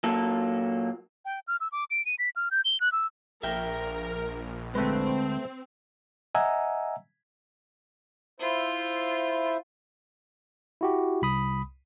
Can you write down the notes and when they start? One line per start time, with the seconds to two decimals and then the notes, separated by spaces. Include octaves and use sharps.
0.04 A#2 F#3 A#3 A4
1.25 G5
1.48 F6
1.60 E6
1.72 D6
1.91 D7
2.06 D#7
2.19 B6
2.36 F6
2.51 G6
2.65 G7
2.80 F#6
2.92 E6
3.43 A#1 A#4 E5 G5
4.75 D2 G#3 A3 C4 B4
6.35 D#5 E5 F#5 G#5 A#5 E6
8.40 E4 F4 C5 E5
10.81 E4 F#4 G4
11.22 C2 B5 D#6